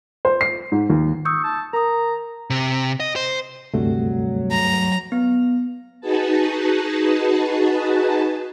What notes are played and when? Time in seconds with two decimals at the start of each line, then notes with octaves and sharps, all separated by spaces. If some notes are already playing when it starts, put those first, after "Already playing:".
0.25 C5
0.41 C7
0.72 G#2
0.90 D#2
1.25 C#6 D#6 E6 G6
1.44 A5
1.73 A#4 A#5 D#6
2.50 C3
3.00 D#5
3.16 C5
3.74 D2 G2 C3 F#3 G3 A3
4.51 A#5
5.12 B3
6.01 D#4 F#4 G#4 B4 A5